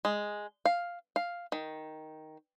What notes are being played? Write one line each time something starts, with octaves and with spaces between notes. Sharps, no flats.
G#3
F5
F5
D#3